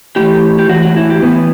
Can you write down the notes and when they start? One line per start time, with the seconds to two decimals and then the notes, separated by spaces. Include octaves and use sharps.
0.16 A2 E3 G4
0.59 G4
0.69 E3 F#4
0.74 A2
0.82 F#4
0.97 E4
1.10 G4
1.22 A2 E3 B3